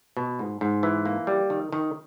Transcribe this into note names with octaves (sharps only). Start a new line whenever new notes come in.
B2
G#2
G#2
E3
A#3
G3
D#3
D#3